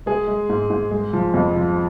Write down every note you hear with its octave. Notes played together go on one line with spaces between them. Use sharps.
G#3 G#4
G#3
G#2
G#2
G#3
F3
F2
F3